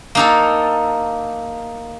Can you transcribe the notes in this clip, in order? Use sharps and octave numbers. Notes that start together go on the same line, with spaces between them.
A#3 D#4 A4